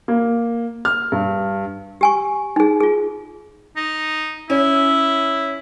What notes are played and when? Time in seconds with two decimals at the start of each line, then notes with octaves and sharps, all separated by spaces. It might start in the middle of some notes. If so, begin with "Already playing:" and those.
0.08 A#3
0.85 F6
1.12 G2
2.01 G4 G#5 C#6
2.56 D#4 G#4
2.80 F4 G#4
3.76 D#4
4.50 C#4 E4